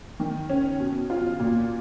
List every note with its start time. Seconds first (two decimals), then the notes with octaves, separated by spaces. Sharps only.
0.20 D#3
0.49 C#4
0.80 B2
1.10 F4
1.39 A#2